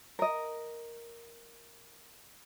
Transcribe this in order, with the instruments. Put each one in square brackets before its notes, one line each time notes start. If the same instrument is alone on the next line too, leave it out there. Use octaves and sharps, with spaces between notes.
[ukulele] A#4 D#5